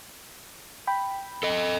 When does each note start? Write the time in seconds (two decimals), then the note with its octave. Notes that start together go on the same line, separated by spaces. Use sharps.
0.87 G5 B5
1.43 A4 D#5